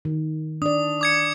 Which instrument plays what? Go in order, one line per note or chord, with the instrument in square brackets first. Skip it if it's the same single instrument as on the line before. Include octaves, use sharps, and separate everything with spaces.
[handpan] D#3
[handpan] D4 D5 [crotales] D#6
[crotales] D6 G#6 C#7